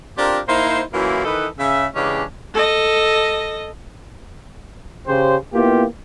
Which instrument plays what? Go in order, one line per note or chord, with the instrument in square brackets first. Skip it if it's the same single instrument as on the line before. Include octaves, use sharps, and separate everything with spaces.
[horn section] C4 D4 F4 G4 A#4
A#3 D#4 E4 C5
F#2 E3 F#3 A#3 E4 F4
D#3 E3 D#4 A4 B4
C#3 E5
C#3 E3 G#3 C#4 D4 G4
[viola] A4 D#5
[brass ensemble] C#3 G4 C5
A#3 B3 E4 F4 G4